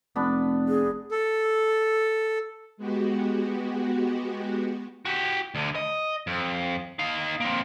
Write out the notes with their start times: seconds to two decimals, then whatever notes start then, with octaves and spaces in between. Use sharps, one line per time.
0.16 F1 B3 D4 B5
0.68 G#4
1.11 A4
2.77 G#3 B3 F#4 G4
5.05 F#4 G4
5.55 D2 D3
5.75 D#5
6.27 F2
6.99 D#4 F5
7.40 A#3 C4